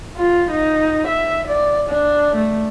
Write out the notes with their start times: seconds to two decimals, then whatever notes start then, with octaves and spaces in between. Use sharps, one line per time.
0.17 F4
0.51 D#4
1.07 E5
1.48 D5
1.90 D4
2.35 A3